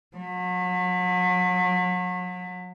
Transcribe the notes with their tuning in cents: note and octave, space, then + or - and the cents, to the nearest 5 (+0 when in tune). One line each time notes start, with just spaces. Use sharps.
F#3 -35